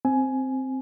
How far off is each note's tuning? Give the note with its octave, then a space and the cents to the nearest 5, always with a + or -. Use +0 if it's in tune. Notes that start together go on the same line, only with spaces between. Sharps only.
C4 +0 G#5 +15